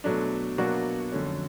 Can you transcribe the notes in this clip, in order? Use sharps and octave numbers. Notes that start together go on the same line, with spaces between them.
B2 F#3 A3 D4
B2 F#3 A#3 D4 F#4
F2 D3 F#3 A3 C#4